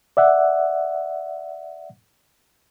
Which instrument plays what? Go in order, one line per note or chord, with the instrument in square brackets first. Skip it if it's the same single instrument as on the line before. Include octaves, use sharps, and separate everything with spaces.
[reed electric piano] D5 E5 F#5